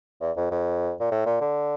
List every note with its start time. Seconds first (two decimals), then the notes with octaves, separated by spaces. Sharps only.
0.20 E2
0.36 F2
0.51 F2
1.00 A#2
1.11 A2
1.26 A#2
1.41 D3